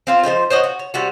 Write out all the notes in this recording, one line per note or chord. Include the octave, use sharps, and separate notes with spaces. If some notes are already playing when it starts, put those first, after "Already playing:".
C4 F4 C5
F3 G3 D#4 C5
C5 C#5 D#5 F#5
F#4
C#5
C3 G3 F#4